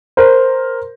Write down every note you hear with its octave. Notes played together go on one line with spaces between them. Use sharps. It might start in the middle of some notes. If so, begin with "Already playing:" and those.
A#4 C5